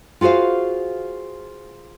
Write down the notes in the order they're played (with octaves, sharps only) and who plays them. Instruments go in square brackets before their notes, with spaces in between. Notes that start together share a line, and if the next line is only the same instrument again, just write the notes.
[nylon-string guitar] F4 F#4 G#4 C5 F5